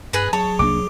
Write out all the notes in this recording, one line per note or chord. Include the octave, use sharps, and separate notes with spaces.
G2 G#4 B4 A#5 F#6
F#3 G#4 C#5 A5
C2 A#3 D4 D6